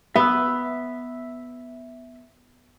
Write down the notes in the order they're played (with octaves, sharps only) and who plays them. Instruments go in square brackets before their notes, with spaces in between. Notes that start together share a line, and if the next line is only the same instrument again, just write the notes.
[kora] B3 [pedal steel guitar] E5 E6